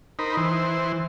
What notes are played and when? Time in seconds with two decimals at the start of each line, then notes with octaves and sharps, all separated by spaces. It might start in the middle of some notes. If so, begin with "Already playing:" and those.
0.19 D#4 A#4 C5 B5
0.37 E3 C5